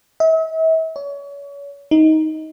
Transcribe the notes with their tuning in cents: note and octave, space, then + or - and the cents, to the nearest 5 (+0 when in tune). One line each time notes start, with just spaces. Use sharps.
E5 -40
C#5 +35
D#4 +15